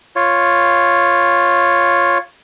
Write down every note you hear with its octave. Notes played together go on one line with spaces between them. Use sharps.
F4 C#5